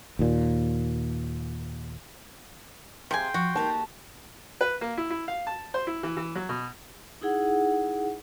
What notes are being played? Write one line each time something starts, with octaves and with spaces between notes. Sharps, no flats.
D#2 A#2
C3 G#4 F5 G5 G#5 C6
F3 F#4
A#3 D#4 G4 A5
B4
A#3
E4
E4
F5
A5
C5
E4
E3
E3
F#3
B2
D#4 E4 G#4 F#5